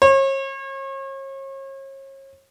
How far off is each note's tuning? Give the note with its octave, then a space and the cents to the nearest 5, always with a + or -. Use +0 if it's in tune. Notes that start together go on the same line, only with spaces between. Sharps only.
C#5 -40